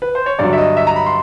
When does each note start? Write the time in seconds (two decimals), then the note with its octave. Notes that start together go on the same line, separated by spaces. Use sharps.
0.02 B4
0.15 C5
0.26 C#5
0.39 G2 D3 F#3 D5
0.53 E5
0.58 D#5
0.77 E5
0.87 A#5
0.96 B5
1.06 C6